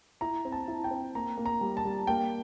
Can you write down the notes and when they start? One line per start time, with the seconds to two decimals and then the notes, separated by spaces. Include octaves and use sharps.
0.21 E4 A#5
0.45 C4
0.52 A5
0.68 E4
0.84 G5
0.91 C4
1.15 A#3 A#5
1.37 A#3
1.46 A#5
1.61 G3
1.77 A5
1.85 G3
2.07 A#3 G5